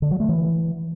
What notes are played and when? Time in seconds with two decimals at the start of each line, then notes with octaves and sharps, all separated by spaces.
0.02 D3
0.11 F#3
0.20 A3
0.29 E3